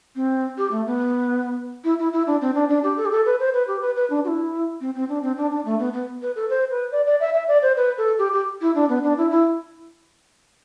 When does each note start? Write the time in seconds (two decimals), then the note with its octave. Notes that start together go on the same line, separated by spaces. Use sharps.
0.16 C4
0.58 G4
0.71 A3
0.86 B3
1.84 E4
1.99 E4
2.13 E4
2.27 D4
2.41 C4
2.55 D4
2.69 D4
2.83 G4
2.97 A4
3.06 G4
3.11 A4
3.26 B4
3.39 C5
3.54 B4
3.67 G4
3.81 B4
3.96 B4
4.10 D4
4.24 F#4
4.28 E4
4.80 C4
4.95 C4
5.09 D4
5.23 C4
5.37 D4
5.51 D4
5.65 A3
5.79 B3
5.93 B3
6.22 B4
6.36 A4
6.50 C5
6.70 B4
6.92 D5
7.06 D5
7.20 E5
7.34 E5
7.48 D5
7.62 C5
7.77 B4
7.98 A4
8.19 G4
8.33 G4
8.61 E4
8.75 D4
8.89 B3
9.03 D4
9.17 E4
9.31 E4